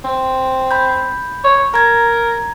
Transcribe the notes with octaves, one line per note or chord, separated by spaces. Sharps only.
C4
B5 G6
C#5
A#4 A#5 G#6